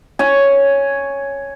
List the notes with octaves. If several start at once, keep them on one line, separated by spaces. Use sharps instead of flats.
C#5 G#5